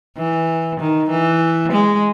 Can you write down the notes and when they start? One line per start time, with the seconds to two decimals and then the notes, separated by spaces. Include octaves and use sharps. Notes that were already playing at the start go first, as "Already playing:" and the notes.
0.17 E3
0.80 D#3
1.10 E3
1.72 G#3